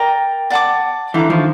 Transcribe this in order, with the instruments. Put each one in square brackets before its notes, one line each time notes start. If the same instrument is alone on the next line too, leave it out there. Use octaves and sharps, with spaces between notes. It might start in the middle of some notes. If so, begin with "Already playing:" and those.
Already playing: [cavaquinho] A#4 D5 G5 A#5
D5 F#5 A5 D6
[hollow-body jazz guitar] D3 E3 [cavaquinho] C5 F5 A#5 D6
[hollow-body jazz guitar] D#3 F3